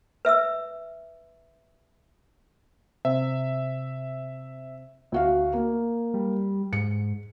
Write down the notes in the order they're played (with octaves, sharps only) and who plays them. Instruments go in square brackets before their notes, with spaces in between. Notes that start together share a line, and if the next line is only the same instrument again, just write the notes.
[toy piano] B4 E5 D#6 E6
[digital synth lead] C3 [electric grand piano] E5
[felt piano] D2 F#4 F5
A#3
[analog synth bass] G3
[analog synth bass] G#2 [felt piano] C#7